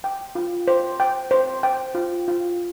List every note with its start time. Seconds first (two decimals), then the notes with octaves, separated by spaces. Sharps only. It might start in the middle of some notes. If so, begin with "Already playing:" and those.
0.04 G5
0.35 F4
0.68 C5
1.00 G5
1.31 C5
1.63 G5
1.95 F4
2.28 F4